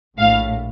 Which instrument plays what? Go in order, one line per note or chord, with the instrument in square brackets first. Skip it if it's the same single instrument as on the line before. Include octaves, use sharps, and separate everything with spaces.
[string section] A#1 A2 F5